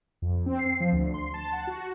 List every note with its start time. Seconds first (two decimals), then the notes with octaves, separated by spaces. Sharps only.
0.22 F2
0.46 C4
0.59 C7
0.80 F3
0.92 D2
1.14 C6
1.34 A5
1.53 F#5
1.67 F#4